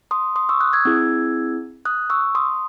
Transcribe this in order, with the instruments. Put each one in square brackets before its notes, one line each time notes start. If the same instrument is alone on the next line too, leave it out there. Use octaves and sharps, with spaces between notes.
[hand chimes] C6 D#6
C6 D#6
C#6 E6
D#6 F#6
E6 G#6
C4 E4 G#4
D#6 F#6
C#6 E6
C6 D#6